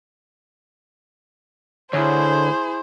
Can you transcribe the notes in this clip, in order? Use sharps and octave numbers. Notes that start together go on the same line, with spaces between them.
D2 E4 G#4 C5 C#5